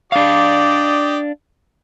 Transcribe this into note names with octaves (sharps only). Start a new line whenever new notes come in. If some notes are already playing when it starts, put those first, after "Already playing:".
D4 G4 D5 D#5 F5